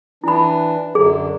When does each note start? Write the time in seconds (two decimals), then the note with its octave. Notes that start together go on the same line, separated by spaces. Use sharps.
0.24 E3 D4 E4 B5
0.95 F#2 D3 F#3 G#4